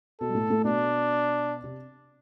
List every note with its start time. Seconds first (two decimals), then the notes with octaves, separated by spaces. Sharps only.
0.21 B2 B3 A4
0.29 G3
0.35 A2 A3
0.50 A2 A3
0.64 B2 B3 D4
1.64 C3 C4